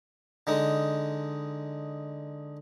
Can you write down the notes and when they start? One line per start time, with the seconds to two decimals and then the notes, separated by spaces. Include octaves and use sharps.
0.47 D3 G#3 D#4